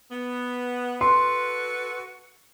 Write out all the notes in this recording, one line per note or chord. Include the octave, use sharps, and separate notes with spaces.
B3
F#4 A4 B4 C6